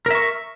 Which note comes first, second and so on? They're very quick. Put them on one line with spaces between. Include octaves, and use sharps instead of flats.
A#4 E5 C#6